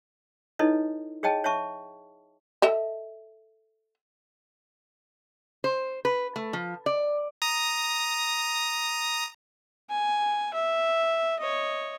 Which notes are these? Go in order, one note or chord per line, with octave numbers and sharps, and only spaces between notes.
D#4 E4 A4 B4 C#5 D#5
G#4 C#5 D#5 G5 A5
C#5 E5 A5 C#6
A4 D#5 E5
C5
B4
A3
F3
D5
A#5 D#6
G#5
E5
C#5 D#5